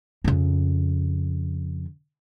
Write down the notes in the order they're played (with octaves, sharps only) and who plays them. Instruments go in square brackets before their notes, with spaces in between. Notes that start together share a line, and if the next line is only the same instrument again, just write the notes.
[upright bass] F2 C#3